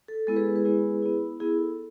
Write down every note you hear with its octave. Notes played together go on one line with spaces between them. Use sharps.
A4
G#3 B3 E4 A4
G#4 B4
G#4 B4
G#3 B3 E4
B3 E4
B3 E4 G#4
A4